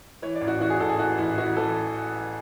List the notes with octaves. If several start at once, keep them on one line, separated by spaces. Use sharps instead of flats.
E3 C#5
D5
A1
F#4
E3 F#4
G#4
A1 A4
G#4
E3 F#4
A1 E4
E3 F#4
E3 A4